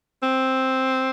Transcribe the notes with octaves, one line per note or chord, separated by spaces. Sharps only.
C4